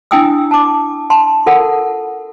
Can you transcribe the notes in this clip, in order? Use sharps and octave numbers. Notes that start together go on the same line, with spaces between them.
D4 E4 G5 G#5 D#6 E6
A5 D6
A5 C6
F4 A4 A#4 F#5